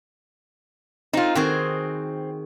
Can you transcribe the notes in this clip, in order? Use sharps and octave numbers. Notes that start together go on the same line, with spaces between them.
C4 D#4 F4
D#3 C4 F#4 G#4